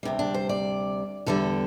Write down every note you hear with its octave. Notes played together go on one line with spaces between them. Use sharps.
D2 C3 G3
D4
C5
D5
E2 D3 G3 A4